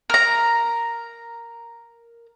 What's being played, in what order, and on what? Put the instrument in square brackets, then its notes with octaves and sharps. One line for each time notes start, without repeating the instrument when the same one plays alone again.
[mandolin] A#4 A#5